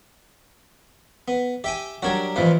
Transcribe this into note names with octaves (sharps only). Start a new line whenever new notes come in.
B3
G4 E5 G5 G#5
F#3 G3 D4 F#4 A#4 G#6
A1 E3 F3 F4 B4